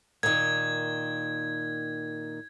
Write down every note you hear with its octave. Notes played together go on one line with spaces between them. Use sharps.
A#2 D#3 G#6